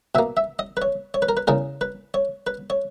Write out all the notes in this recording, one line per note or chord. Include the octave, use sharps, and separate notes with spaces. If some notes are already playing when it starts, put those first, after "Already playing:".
B2 A#3 E5
E5
D#5
B4
C#5
C#5
B4
A#4
B4
E2 C#3 G#3 A#4
B4
C#5
B4
C#5